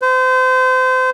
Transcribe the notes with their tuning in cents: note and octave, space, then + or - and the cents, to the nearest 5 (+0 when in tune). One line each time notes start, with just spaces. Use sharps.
C5 -30